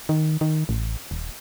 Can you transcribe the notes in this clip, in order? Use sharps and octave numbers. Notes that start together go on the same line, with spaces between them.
D#3
D#3
A1
D#1